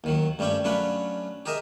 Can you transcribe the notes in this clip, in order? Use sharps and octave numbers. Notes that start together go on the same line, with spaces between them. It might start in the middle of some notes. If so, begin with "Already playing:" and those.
D#2 D#3 F#3
G2 G3 A3 C#4 G4
F#3 A3 C#4 D4 B4 F5
G4 G#4 A#4 D#5 E5